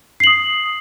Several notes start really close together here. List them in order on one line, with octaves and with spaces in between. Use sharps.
C7 F#7 D#6